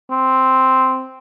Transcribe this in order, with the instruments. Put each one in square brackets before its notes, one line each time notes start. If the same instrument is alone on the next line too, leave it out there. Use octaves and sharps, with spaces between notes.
[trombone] C4